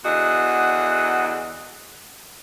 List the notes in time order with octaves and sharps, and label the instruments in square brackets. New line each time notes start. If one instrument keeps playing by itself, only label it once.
[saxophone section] E2 D3 F#4 D#5